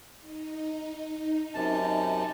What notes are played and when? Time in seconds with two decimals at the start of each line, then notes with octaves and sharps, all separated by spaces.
0.21 D#4
1.54 F#2 C3 A5